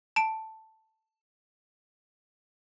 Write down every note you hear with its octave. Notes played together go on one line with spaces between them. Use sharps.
A5 D7